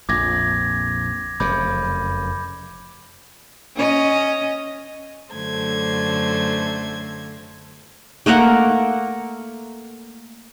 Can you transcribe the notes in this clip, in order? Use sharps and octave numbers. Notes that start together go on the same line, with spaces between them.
A#1 F2 D6 G#6 A#6
F1 F#2 C#3 B5 D6 G6
C#4 D#5
F#2 D3 A3 C5 G#6
A3 A#3 A#4 F#5